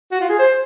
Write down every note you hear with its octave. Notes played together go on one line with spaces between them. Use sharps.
F#4
F4
G#4
C5